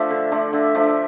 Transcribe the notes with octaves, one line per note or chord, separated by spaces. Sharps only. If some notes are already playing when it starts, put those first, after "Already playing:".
Already playing: F3 A3 D4 E5
D3
F3 A3 D4
D3 E5
F3 A3 D4